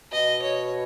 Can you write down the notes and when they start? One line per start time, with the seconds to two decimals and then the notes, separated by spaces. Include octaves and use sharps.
0.12 B2 D#5
0.42 C#5